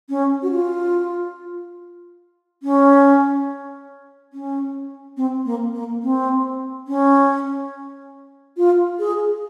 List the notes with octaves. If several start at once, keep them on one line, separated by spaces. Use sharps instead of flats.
C#4
F#4
F4
C#4
C#4
C4
A#3
A#3
C4
C#4
F4
G#4